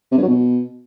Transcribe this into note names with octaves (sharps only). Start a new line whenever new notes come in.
C3
G2
F#3
B2